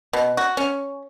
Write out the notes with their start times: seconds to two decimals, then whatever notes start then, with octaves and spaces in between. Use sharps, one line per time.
0.13 B2
0.37 F#4
0.57 C#4